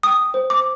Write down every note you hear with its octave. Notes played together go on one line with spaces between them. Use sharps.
G5 D#6
C5
D6